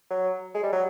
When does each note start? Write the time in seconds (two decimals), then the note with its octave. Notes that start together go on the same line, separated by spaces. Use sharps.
0.10 F#3
0.55 G#3
0.64 G3
0.73 F#3